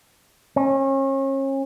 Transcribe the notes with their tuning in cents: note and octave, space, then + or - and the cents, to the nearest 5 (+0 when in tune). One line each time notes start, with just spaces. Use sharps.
C#4 -35